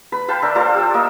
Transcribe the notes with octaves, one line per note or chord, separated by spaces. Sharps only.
B4 B5
B4 F5 G5 A5
D4 A4 A#4 E5
F4 A4 C5 D5
G4 E6
A#3 D#5 E5